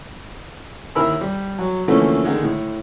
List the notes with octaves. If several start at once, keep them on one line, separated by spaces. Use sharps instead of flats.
D#2 E4 A#4 B5 E6
G3
F#3
D3 E3 F3 A3 A#3 C#4
D3 D#3 G#3
A2